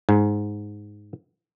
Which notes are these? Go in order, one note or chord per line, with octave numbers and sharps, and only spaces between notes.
G#2